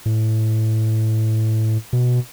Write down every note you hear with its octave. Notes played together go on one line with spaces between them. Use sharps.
A2
B2